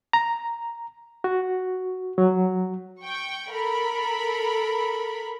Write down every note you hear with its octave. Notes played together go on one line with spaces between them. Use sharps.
A#5
F#4
F#3
G5 C#6
A4 A#4 B5